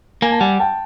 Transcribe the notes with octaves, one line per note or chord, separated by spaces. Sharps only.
A#3 G#5
A5
G3 F#5 G#5
G5 A5